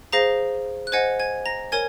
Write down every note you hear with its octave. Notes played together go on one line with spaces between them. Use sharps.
G#4 C5 F5 A#5 A#6
F#6
C5 D#5 F#5 G#5 G#6
G#5 G#6
A#5 A#6
A#4 C#5 G#5 G#6